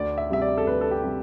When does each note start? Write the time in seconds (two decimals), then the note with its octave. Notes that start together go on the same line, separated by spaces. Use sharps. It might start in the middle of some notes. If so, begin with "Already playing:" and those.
Already playing: D2 D5
0.18 E5
0.30 C3 G3 E5
0.42 D5
0.58 A4
0.67 D2 B4
0.81 A4
0.91 G4
1.04 C3 G3